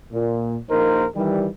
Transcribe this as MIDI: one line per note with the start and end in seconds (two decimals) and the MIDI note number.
0.12 0.56 46
0.69 1.04 34
0.69 1.04 58
0.69 1.04 63
0.69 1.04 70
0.69 1.04 72
1.16 1.47 51
1.16 1.47 52
1.16 1.47 55